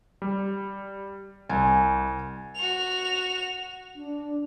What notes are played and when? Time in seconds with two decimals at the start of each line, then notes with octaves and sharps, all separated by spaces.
0.22 G3
1.49 C2 G#5
2.55 F#4 F7
3.96 D4